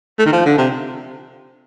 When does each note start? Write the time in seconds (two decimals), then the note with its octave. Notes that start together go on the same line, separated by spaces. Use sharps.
0.19 A3
0.26 D#3
0.32 F3
0.46 D3
0.58 C3